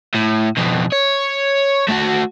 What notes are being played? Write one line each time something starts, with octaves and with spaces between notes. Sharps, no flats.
A2
F2 B2
C#5
A3 F#4